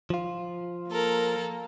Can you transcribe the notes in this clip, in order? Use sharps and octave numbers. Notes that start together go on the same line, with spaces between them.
F3 F4
A#3 A4 A#4